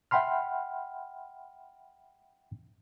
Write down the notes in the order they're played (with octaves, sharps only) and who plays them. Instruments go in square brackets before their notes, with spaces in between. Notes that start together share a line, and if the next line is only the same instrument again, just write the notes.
[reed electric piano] E5 F#5 G5 B5 C6 F6